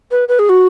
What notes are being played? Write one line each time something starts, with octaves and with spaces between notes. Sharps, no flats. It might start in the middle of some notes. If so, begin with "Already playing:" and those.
B4
B4
G#4
F#4